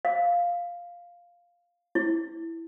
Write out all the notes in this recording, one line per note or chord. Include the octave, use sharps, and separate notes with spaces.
F5
E4